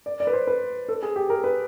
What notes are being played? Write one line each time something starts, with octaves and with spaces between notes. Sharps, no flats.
D5
D5
B4
C5
B4
A4
G#4
G4
A#4
B4